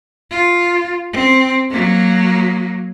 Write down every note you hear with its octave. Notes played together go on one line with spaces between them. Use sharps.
F4
C4
F#3 A#3